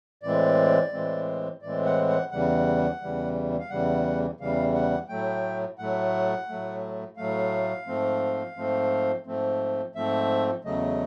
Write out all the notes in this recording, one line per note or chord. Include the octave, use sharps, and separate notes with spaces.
A2 E3 G#3 C4 D5
A2 E3 G#3 C4
A2 E3 G#3 C4 D5
F#5
F#5
E2 C#3 E3 G3 F#5
E2 C#3 E3 G3
F5
E2 C#3 E3 G3 F#5
E2 C#3 E3 G3 F5
F#5
A2 F#3 A3 G5
A2 F#3 A3 F#5
A2 F#3 A3
A2 F#3 A3 F5
G#2 F3 A3 C4
G#2 F3 A3 C4
G#2 F3 A3 C4
G#2 F3 A3 C4 E5
E2 C#3 F#3 A3 D#5